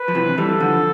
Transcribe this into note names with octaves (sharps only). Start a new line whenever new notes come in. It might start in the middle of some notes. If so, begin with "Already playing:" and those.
Already playing: B4
F3
C3 E3
E3 G3 A4
D3 F3